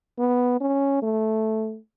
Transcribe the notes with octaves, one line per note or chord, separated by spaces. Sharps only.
B3
C#4
A3